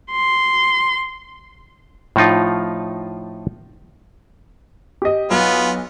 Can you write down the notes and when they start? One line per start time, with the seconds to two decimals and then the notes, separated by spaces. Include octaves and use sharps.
0.11 C6
2.16 A2 F3 D#4 F4
5.02 G4 D#5
5.31 B1 B3 F4